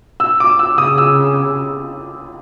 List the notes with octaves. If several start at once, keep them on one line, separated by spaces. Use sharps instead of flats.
E6
D6
E6
C#3 D#6
E6